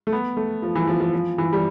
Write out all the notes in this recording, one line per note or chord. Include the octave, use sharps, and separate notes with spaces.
A3
B3
A3
F3
E3
F3
F3
F3
E3
G3